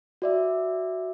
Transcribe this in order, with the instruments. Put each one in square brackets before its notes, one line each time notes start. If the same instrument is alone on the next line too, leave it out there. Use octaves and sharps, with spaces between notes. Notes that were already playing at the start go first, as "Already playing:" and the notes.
[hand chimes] F#4 D5 E5